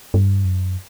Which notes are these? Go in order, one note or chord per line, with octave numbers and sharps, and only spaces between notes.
G2
F#2